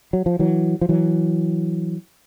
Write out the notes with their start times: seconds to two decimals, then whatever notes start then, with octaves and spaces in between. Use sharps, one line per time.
0.13 F#3
0.26 F3
0.39 E3 F#3
0.81 F3
0.89 E3 F#3